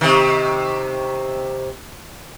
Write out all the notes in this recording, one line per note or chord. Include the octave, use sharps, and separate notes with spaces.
C3 D#3